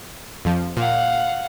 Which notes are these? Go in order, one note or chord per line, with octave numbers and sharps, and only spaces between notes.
F2 F3
A#2 F5 F#5